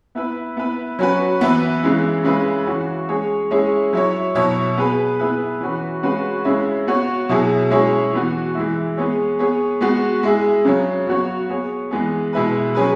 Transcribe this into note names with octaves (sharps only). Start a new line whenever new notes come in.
B3 E4 B4
B3 E4 B4
F#3 C#4 F#4 B4
E3 B3 E4 B4
C#3 E3 G#3 E4
C#3 G#3 E4 B4
E3 C#4 F#4
G#3 C#4 G#4 C#5
G#3 C#4 E4 G#4 C#5
F#3 E4 C#5
B2 F#3 E4 C#5
B3 G#4 B4
B3 E4 G#4 B4
E3 C#4 F#4 B4
C#3 G#3 C#4 F#4 B4
C#3 G#3 C#4 E4
B3 F#4 C#5
B2 F#3 E4 G#4
G#3 C#4 E4 G#4 C#5
E3 B3 F#4
E3 G#3 E4
G#3 B3 G#4 C#5
B3 G#4 C#5
G#3 B3 F#4
G#3 E4 G#4
C#3 F#3 C#4
F#3 B3 F#4 C#5
B3 G#4 C#5
E3 G#3 B3 G#4
B2 G#3 E4 B4
F#3 C#4 G#4 B4